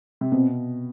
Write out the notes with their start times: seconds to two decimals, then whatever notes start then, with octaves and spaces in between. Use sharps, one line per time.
0.21 C3
0.32 B2 C4